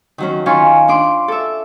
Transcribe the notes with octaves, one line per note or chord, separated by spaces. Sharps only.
D#3 F#3 C#4
D#3 C#4 F4 G#5 C6 C#6
D4 C6 D6
A4 E5